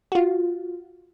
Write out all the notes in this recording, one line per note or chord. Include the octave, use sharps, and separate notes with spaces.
F4 F#4